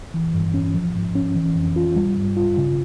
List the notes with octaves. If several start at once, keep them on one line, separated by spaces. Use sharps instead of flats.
E3
G2
C#4
F3
G#2
C#4
E3
F2
F4
G3
G2
F4
C#3